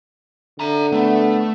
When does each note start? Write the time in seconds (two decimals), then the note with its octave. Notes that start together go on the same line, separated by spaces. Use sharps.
0.60 D3 E5 A#5
0.92 A3 B3